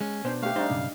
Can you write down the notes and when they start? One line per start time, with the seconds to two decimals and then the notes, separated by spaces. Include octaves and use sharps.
0.01 G#3 C#4
0.25 B2 B3 D4 C5
0.43 A3 G4 F5
0.56 G3 D4 D#4 C5
0.70 B1 G2 C#3